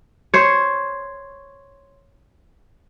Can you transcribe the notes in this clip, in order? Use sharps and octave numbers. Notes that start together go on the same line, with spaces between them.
C5 C#5